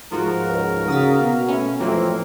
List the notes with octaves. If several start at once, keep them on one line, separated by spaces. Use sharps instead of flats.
G#2 F3 F4 F#4 A#4
C#2
C#3 A#3 F#4 D#6 A6 B6
B2 F5
A3 C#4 E4
F2 A2 E3 F#3 A#3 C4